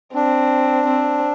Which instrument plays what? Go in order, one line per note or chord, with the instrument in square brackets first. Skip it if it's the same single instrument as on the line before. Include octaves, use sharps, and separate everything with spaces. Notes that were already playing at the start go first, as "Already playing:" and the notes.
[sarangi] C4 [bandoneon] D4
[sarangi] C4